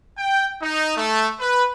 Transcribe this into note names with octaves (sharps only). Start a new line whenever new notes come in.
G5
D#4
A3
B4